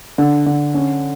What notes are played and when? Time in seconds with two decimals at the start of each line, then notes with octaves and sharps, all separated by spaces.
0.18 D3
0.46 D3
0.74 C#4